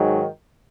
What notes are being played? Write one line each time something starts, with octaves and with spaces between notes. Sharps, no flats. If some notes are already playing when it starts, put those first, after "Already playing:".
Already playing: G#2 D#3 F#3